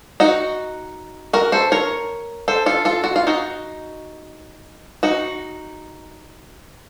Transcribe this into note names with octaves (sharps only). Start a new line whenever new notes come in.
D#4 F#4
F#4 A#4
A4 C5
A#4 C#5
A4 C5
F4 A4
F4 A4
F#4
F4
D#4 F#4
D#4 F#4